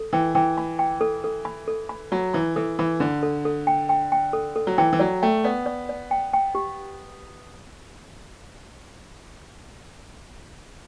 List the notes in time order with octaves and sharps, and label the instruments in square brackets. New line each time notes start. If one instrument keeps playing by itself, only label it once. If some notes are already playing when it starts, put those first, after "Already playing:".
Already playing: [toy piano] A4
[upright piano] E3 [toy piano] G5
[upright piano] E3 [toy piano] G5
[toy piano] B5
G5
A4
A4
B5
A4
B5
[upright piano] F#3 [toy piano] B5
[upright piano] E3 [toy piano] B5
[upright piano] E3 [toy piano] A4
[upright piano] E3 [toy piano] B5
[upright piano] D3 [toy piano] B5
[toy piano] A4
A4
G5
G5
G5
A4
A4
[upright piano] F#3
[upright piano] E3 [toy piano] G5
[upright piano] E3
[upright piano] F#3 [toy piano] D5
[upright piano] A3 [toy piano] G5
[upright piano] B3 [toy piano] D5
[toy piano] D5
D5
G5
G5
G4